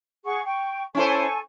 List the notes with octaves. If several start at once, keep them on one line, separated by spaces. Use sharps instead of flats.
G#4 F#5 C#6
G5 C#6
C#4 E4 A4 C5 G#5 C#6